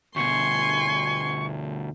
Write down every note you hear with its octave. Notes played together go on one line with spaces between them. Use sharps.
D2 B2 G#5 C6 C#6